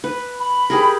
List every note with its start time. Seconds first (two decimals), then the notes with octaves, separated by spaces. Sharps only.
0.04 B4
0.39 B5
0.70 G4 G#4 A#4